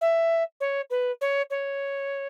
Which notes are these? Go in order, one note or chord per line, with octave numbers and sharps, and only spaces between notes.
E5
C#5
B4
C#5
C#5